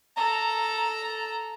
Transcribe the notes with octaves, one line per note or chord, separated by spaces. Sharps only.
A4 A#5